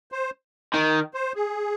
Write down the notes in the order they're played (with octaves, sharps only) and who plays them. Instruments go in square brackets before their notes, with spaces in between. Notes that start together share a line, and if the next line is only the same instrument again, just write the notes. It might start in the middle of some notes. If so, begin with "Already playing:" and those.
[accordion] C5
[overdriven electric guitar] D#3
[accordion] C5
G#4